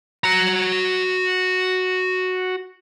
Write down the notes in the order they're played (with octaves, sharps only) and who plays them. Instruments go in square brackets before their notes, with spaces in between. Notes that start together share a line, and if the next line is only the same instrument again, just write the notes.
[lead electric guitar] F#4 A#5